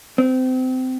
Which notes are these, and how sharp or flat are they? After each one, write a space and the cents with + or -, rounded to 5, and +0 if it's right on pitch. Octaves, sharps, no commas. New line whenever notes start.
C4 -25